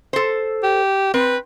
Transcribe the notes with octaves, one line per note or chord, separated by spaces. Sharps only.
A4 C5
G4
C4 B4